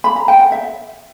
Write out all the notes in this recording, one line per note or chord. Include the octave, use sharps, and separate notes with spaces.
B5
A#5
G5
F#5
E5